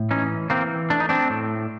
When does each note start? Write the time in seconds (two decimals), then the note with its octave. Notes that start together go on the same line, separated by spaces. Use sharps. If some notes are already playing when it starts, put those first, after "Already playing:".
Already playing: A2
0.11 E3 C#4 D#4
0.50 E3 A#3 C4
0.90 A3 D4
1.00 D#4
1.09 C4 D4
1.30 A2